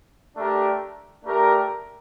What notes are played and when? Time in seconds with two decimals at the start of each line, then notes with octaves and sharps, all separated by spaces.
0.35 A3 D4 G4 A#4
1.24 A3 D4 G4 A#4